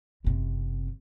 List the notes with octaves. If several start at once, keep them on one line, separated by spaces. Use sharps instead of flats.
F#1 C3